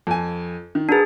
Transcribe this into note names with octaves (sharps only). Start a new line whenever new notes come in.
F2 G#5
D#3
D4 F#4 G#4 A#4 B4